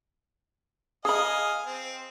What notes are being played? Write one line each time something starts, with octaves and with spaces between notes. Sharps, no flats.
G#4 D#5 F5 G#5 B5
C4